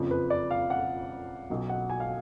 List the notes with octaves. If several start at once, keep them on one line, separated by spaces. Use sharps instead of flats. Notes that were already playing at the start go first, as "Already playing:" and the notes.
Already playing: F#1 F2 F3
B4
D5
F5
F#5
B1 B2 F#3
F#5
G#5
F5